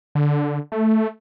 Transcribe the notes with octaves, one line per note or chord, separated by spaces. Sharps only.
D3
A3